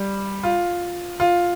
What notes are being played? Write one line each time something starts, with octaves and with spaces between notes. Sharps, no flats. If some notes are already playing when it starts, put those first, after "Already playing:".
Already playing: G3
F4
F4